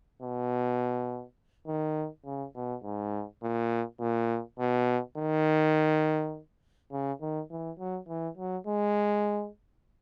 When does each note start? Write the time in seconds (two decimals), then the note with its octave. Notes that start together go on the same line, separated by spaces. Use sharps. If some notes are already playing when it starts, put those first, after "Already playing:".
0.22 B2
1.67 D#3
2.26 C#3
2.55 B2
2.84 G#2
3.43 A#2
4.00 A#2
4.60 B2
5.18 D#3
6.92 C#3
7.21 D#3
7.51 E3
7.79 F#3
8.08 E3
8.37 F#3
8.67 G#3